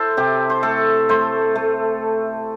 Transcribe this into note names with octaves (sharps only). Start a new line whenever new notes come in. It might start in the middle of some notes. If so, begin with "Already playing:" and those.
Already playing: E4 A4 C5
C3 G4
C5
A3 A4
A3 C5
A3